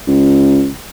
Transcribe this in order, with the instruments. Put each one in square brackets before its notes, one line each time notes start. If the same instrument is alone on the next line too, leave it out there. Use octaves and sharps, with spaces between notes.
[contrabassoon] C#2